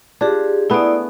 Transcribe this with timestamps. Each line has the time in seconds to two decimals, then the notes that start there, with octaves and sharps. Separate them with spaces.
0.21 D4 F4 G4 G#4
0.70 A3 B3 E4 G#4 D5